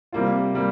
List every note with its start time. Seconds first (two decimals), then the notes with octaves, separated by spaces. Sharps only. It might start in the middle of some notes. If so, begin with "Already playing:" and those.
0.12 C3 G3 A#3 F4
0.54 C3 G3 A#3